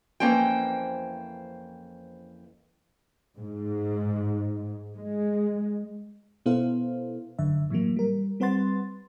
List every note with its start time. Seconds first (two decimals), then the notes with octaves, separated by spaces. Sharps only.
0.20 F2 E3 A#3 C#4 C5 G5
3.39 G#2
4.96 G#3
6.46 B2 B3 E4 A4 C5 F5
7.39 G1 F#2 D3 E5
7.70 A2 E3 F#3 A#3
7.97 G3 A#4
8.40 G3 C4 B4 F#5 C6 A6